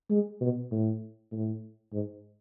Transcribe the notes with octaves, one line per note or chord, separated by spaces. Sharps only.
G#3
B2
A2
A2
G#2